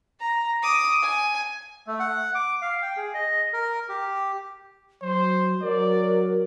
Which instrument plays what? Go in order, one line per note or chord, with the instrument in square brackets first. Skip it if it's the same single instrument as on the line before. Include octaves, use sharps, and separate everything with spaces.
[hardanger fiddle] A#5
D6 D#6
G#5
[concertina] A3
F#5
D6
F5
G5
G#4
D#5
A#4
G4
[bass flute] F#3 [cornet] C5
[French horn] F#3 [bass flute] A#4 [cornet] D5